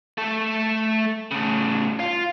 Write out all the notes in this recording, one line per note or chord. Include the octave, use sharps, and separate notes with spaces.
A3 A4
A2 C#3
F4